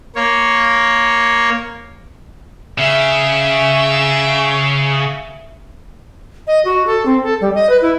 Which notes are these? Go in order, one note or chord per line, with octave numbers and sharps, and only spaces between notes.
A#3 C#5
C#3 E5 G#5
D#5
F#4
A4
C4
A4
G3
D#5
B4
E4